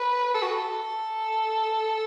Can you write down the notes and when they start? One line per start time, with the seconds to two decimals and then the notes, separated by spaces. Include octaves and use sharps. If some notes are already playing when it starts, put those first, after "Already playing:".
Already playing: B4
0.34 A4
0.42 F#4
0.51 A4